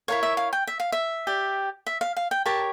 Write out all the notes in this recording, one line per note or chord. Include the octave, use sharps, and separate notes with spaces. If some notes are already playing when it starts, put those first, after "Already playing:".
E4 A#4 C#5 F5
E5
F5
G5
E5
F5
E5
G4 D5
E5
F5
F5
G5
G4 A#4 C#5 A5